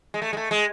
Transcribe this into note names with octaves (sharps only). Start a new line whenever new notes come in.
G#3
A3
G#3
A3
G#3